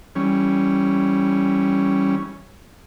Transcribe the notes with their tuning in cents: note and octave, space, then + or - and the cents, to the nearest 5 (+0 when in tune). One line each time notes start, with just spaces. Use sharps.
E3 +0 G3 -10 C#4 +0